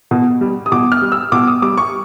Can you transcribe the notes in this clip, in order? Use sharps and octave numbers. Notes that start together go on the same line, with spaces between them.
B2
G3
D#6
B2 D6
F6
G3
E6
B2 D6
D#6
G3 D6
C#6